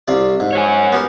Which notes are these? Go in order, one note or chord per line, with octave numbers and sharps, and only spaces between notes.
C2 C3 D5
G#2
C#5 F#5 G#5
B3 G4 A#4